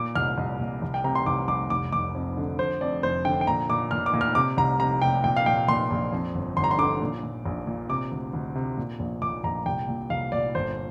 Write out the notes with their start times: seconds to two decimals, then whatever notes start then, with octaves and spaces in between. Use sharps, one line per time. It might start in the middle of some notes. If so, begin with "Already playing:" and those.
Already playing: A#2 D6
0.15 C2 F6
0.38 C2
0.60 A#2
0.82 C2
0.94 G5
1.04 C3 A#5
1.15 C6
1.26 C2 D6
1.48 C2 D6
1.70 F1 D6
1.92 F1 D6
2.15 F2
2.37 D3
2.59 F2 C5
2.81 F2 D5
3.03 F1 C5
3.25 D3 G5
3.41 G5
3.47 A#2 A#5
3.70 A#2 D6
3.91 A#2 F6
4.06 D6
4.13 A#2
4.21 F6
4.35 C3 D6
4.57 C2 A#5
4.80 C3 A#5
5.02 C3 G5
5.24 A#2 G5
5.36 F5
5.46 A#2 G5
5.68 A#2 C6
5.91 A#1
6.12 F2
6.35 G1
6.56 G1 C6
6.64 A#5
6.71 C6
6.79 D3 D6
7.01 A#2
7.23 A#2
7.46 A#1
7.67 A#2
7.89 C3 D6
8.11 D2
8.33 D2
8.55 C3
8.78 A#2
9.00 A#1
9.22 A#2 D6
9.44 A#1 A#5
9.66 C2 G5
9.88 A#2
10.10 C2 F5
10.32 A#2 D5
10.55 G1 C5